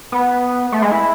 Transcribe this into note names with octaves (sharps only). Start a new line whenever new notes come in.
B3
A3
G#3
E4